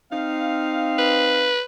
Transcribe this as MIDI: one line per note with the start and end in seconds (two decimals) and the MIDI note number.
0.12 1.55 60
0.12 1.55 63
0.12 1.55 77
0.98 1.61 71